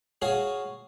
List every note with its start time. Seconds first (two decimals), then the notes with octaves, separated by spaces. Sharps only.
0.22 F#4 G#4 C#5 F5